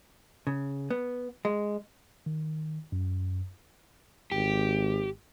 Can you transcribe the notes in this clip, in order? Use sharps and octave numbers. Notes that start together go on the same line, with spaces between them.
C#3
B3
G#3
D#3
F#2
G#1 G4